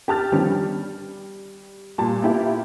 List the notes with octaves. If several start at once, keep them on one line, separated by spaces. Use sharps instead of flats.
G4 A5 F6 A6
D#3 F3 G3 B3 C#4 D4
G3
A#2 G3 A5
A#3 B3 E4 F4 G4 E5